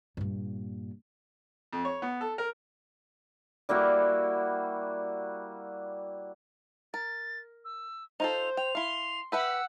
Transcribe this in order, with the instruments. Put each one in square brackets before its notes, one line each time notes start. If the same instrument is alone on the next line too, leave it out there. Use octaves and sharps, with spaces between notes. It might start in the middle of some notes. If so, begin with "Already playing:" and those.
[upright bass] G2 A#2
[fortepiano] F2
C#5
B3
A4
A#4
[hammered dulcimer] G3 A#3 E4 F#4
[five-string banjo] A#4 [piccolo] A6
[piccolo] E6
[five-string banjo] D#4 F4 A4 [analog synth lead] C5 [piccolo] F7
[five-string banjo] G5 [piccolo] F7
[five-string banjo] E4 F5 [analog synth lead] C6
[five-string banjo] G4 B4 E5 [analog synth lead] F#5 [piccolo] E6